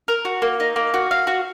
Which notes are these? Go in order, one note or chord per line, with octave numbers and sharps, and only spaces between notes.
A#4
F#4
A#3
D#4
A#3
F#4
F5
F#4